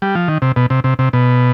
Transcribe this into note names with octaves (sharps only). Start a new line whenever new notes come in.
G3
F3
D#3
C3
B2
C3
C3
C3
B2